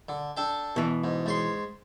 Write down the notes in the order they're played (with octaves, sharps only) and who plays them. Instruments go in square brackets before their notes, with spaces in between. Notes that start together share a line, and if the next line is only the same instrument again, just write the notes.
[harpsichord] D3
D4 A4 G5
[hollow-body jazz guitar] B2 E3
[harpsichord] G#2
G#2 C#5 C6